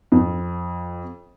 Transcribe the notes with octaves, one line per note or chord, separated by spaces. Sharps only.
F2